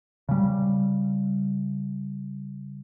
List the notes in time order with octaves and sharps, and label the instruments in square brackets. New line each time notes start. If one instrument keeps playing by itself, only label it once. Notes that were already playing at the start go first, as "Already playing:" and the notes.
[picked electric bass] C#3 G3